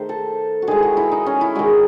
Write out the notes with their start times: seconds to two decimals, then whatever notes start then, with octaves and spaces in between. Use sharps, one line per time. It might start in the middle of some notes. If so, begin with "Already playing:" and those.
Already playing: D#3 A3 C5
0.09 A4
0.62 F#4
0.67 D#3 G#3 G#4
0.78 E4 F#4
0.97 E4
1.12 D#4
1.26 C#4
1.41 E4
1.55 D#3 G#3 F#4